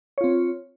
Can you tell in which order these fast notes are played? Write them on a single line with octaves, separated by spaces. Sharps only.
C#5 F4 C4